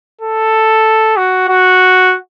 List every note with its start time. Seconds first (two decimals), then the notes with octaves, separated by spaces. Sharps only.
0.21 A4
1.17 F#4
1.49 F#4